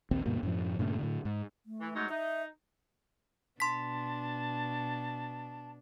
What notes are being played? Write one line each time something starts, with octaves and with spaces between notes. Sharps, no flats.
A#1 D#2 C4
D2 G2 B2 A#3
F#2 A2 F3
G2 A#2 C#3 A3
A2 D3
G#2
A3
E3
G#2 F#3 D#4
D#4 E5
B2 D4 A5 C6 B6